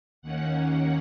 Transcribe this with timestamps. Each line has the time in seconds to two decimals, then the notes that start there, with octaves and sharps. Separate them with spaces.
0.22 D#2 D#3 A#3 C#4 F#5